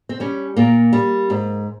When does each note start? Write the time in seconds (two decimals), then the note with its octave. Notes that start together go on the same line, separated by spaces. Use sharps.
0.09 C4
0.20 G3 C#4
0.56 A#2 A#3
0.93 G3
1.30 G#2